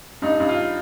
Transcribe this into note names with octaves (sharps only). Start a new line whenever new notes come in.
G2 D#4
G2
F4